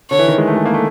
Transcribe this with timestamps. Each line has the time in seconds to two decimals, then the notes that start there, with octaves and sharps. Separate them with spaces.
0.11 D3 C#5
0.19 E3
0.28 D#3
0.38 G#3
0.47 A3
0.56 G#3
0.65 A#3
0.74 A3